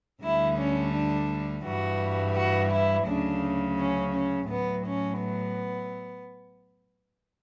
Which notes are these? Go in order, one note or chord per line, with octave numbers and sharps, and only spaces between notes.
D2 D3 G3 E4
C#4
D4
G2 E3 G3 F#4
F#4
E4
D2 C#3 F#3 D4
C#4
C#4
A2 F#3 B3
C#4
B3